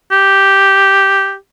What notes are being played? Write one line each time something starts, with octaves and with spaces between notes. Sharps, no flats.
G4